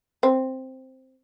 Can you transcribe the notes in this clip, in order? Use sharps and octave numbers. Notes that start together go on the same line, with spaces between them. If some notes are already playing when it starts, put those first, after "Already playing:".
C4